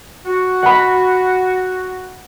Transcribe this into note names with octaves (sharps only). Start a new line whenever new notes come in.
F#4
F#5 B5